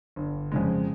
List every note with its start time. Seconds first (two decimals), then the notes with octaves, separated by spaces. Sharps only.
0.16 G1
0.52 F2 C#3 G#3